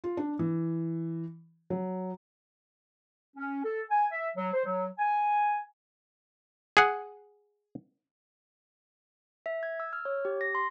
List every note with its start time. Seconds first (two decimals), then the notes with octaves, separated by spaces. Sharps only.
0.04 F4
0.17 D4
0.39 E3
1.70 F#3
3.37 C#4
3.63 A4
3.90 G#5
4.12 E5
4.37 F#3
4.53 C5
4.64 F#3
4.99 G#5
6.77 G#4 F#5
9.46 E5
9.63 G#6
9.80 E6
9.93 F6
10.05 C#5
10.25 G4
10.41 A#6
10.55 C6